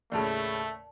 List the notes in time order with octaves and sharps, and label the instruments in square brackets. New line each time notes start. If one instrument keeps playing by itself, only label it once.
[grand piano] D#2 A2 C#3 [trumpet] A3 [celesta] D5 A5